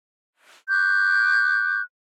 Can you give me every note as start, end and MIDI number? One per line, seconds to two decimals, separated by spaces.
0.69 1.82 85
0.69 1.82 86
0.69 1.82 90
0.69 1.82 91